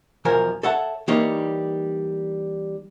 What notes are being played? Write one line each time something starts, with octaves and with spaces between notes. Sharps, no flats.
B1 E2 F3 A#4 G#5
A4 C#5 E5 F#5 A5
E3 G3 A#3 D#4 C#5